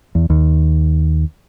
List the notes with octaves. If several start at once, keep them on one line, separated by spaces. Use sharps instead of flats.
E2
D#2